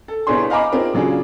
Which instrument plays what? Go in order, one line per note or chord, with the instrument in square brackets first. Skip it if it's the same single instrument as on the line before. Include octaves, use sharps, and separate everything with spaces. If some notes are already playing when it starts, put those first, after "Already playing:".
[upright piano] A4
C2 B3 D4 G#4 C#5 C6
D#5 F5 G#5 A#5 B5 D6
C4 D4 D#4 F4 G#4 A#4
C#3 F#3 D4 F4 G#4